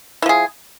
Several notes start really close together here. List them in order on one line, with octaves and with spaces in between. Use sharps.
E4 F3 G#4